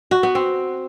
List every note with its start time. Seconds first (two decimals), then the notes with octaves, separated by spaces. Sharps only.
0.11 F#4
0.23 B3
0.35 C4